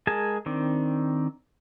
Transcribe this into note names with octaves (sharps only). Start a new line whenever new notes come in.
G#3 G#4 A#4 G#5 A5
D#3 C4 D4